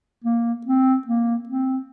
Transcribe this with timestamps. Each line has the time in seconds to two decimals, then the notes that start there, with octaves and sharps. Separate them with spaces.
0.24 A#3
0.67 C4
1.07 A#3
1.49 C4